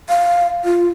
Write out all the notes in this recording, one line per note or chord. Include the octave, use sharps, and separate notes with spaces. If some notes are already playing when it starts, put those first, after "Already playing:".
F5
F4